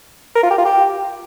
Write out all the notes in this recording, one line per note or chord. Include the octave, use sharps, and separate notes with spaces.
A#4
F4
G4
F4
G4